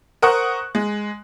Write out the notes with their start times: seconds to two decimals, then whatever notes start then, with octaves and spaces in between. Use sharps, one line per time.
0.22 A#4 C5 F#5 C#6 D#6 F#6
0.75 G#3